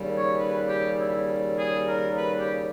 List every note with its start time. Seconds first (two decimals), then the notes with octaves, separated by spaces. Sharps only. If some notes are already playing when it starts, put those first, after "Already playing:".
Already playing: D#2 C#3 G3
0.16 C#5
0.38 B4
0.67 G4
0.98 E4
1.57 G#4
1.87 A#4
2.16 B4
2.38 G4